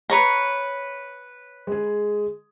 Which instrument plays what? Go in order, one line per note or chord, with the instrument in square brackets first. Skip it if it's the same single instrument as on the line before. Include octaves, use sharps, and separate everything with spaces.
[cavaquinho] B4 C#5 A#5
[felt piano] G#3 G#4